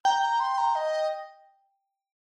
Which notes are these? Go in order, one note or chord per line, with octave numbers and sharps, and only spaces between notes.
G5 A#5
A#5
C6
A#5
D#5